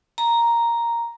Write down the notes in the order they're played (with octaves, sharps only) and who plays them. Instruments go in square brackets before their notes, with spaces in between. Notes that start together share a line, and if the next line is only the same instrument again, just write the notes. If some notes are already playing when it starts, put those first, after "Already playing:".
[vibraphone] A#5